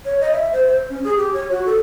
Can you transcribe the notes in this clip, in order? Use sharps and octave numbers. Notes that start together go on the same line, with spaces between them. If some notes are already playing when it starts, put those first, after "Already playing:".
C#5
D#5
E5
C5
C5
C#4
G#4
G4
C#5
F#4
A4